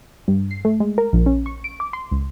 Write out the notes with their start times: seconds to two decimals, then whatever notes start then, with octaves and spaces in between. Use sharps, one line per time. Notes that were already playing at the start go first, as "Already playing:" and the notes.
0.28 G2
0.51 C7
0.65 A3
0.80 G#3
0.98 A#4
1.13 A#1
1.26 C#4
1.46 C#6
1.64 D7
1.80 D6
1.93 C6
2.11 C#2